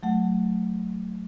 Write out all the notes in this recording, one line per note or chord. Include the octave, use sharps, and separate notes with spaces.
F#3 A3 F#5